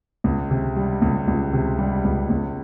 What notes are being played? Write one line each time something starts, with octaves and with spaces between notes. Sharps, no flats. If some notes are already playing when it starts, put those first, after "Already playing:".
C#2
C3
G3
C#2
C#2
C3
G3
C#2
C#2